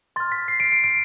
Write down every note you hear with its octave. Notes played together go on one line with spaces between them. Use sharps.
C6 F6 A6
B6
C7
D7
C7
D7